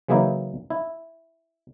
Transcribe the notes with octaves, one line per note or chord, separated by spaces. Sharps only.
C#3 E3 F#3 A#3 D#4 E4
E4